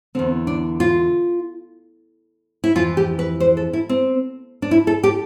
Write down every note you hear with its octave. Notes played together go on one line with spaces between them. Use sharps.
E2 D3 C4
D4
F4
E4
F2 E3 F4
G4
B4
C5
A4
E4
C4
D4
E4
A4
G4